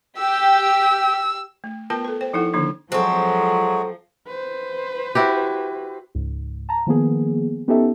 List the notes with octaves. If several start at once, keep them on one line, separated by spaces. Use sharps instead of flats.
G4 E6
A3
B3 F4 A#4 B4 G5 A5
A4 B4
C5 G5
F3 D#4 E4 A4 F#5
D3 D#3 F3 A#3 D4 D#4
F3 F#3 G#3 C4 F#4 G#4 A4
B4 C5
E4 F#4 G4
C#2 G#2
A5 A#5
D#3 F3 A#3 B3 G#4
B3 C#4 D#4 G4 A4 E5